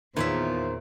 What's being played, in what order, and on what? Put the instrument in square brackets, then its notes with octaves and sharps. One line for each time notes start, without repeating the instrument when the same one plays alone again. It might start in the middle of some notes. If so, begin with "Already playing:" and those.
[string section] E2 [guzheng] A#2 C#5 E5 [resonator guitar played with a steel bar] D#3 [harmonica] F4 C5